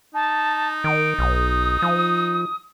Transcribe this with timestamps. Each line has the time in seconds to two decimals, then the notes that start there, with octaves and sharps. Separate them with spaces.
0.14 D#4 A5
0.84 D#3 D7
1.19 B1 D#6
1.82 F3